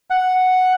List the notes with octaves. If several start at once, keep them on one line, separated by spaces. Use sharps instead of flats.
F#5